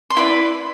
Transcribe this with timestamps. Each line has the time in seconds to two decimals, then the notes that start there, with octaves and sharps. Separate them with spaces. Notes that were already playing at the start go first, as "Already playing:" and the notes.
0.10 C6
0.17 E4 B4 D5 B5